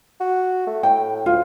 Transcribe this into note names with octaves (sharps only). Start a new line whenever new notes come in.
F#4
A3
A2 G5
D2 F4